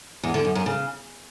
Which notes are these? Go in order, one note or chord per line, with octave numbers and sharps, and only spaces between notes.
E2
D3
F#2
F#2
C#3